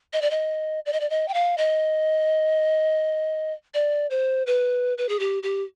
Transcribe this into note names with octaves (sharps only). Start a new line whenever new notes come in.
D#5
D5
D#5
D5
D#5
D5
D#5
G5
F5
D#5
D5
C5
B4
B4
G#4
G4
G4